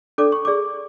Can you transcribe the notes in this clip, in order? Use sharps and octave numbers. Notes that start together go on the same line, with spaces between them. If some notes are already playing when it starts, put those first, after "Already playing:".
D4 A4 D5 D6
C#6
G#4 D5 D6